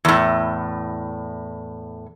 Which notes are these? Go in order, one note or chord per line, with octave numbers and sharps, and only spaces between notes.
E2 A2